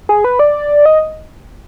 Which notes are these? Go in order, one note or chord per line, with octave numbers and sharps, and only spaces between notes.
G#4
B4
D5
D#5